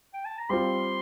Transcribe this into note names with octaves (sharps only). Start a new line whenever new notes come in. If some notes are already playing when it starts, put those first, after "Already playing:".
G5
A5
A#5
G3 C4 F4 C6